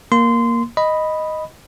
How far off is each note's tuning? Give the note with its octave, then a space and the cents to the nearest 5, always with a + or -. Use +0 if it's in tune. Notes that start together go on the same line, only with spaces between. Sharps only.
A#3 +0 C6 -20
D#5 +0 B5 +0